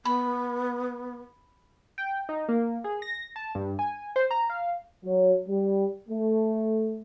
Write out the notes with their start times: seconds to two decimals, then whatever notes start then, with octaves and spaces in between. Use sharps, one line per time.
0.05 B3 B5
1.98 G5
2.29 D#4
2.49 A#3
2.84 G#4
3.02 A#6
3.36 A5
3.55 G2
3.79 G#5
4.16 C5
4.31 A#5
4.50 F5
5.04 F#3
5.48 G3
6.09 A3